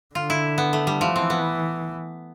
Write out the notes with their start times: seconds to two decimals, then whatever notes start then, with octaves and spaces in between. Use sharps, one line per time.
0.15 D3 F4
0.30 E4
0.58 B3
0.73 A3
0.87 G3
1.01 E3 F3
1.16 C4
1.30 B3